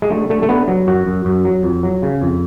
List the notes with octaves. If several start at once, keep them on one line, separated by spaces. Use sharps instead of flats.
G#3
D3 A3
D3 A3
A3
D3 B3
F#3
F#2 F#4
F#2
F#2
F#3
F2
F#3
C#3
F2